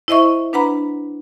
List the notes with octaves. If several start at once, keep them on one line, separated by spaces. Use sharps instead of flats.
E4 C5 D#5 E5 C#6
D4 B4 F#5 A#5 B5